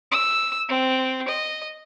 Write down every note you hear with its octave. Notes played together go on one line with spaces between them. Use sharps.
E6
C4
D#5